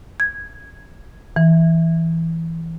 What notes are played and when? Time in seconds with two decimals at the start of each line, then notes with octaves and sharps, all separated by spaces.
0.20 G#6
1.36 E3